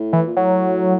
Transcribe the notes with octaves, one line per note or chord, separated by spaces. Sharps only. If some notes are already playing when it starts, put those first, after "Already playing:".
Already playing: A2
E3
A#2
A2 F#3